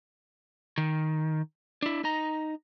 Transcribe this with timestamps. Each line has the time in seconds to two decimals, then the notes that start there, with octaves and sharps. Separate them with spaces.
0.78 D#3
1.82 D4 E4
2.04 D#4 A#5